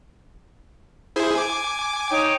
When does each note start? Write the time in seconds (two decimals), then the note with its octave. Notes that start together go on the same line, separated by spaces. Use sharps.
1.16 E4 G#4 C5
1.35 G#5 D6
2.10 D#4 C#5 G5